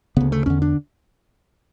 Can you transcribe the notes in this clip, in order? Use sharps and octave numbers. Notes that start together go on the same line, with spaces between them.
D2 C#3 B3
A3
E2 D3 C#4
D4